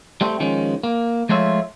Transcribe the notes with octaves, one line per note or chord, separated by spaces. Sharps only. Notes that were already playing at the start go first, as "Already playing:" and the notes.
G3 A3 C4
D#3 F3 G#3 C#4
A#3
F3 G#3 A3 F4 C#5 E5